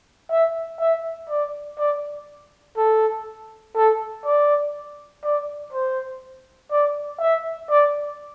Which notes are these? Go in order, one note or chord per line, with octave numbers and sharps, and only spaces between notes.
E5
E5
D5
D5
A4
A4
D5
D5
C5
D5
E5
D5